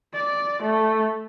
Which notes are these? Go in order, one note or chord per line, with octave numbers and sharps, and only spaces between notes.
D5
A3